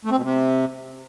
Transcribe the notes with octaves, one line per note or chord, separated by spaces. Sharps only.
A3
C4
B2
C3